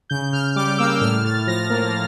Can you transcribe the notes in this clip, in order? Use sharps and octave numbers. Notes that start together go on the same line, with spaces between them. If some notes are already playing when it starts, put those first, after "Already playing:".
C#3 G6
C#3 F6
G3 D6
A#3 E6
E6
A2 F6
A2 A6
F3 A#6
A#3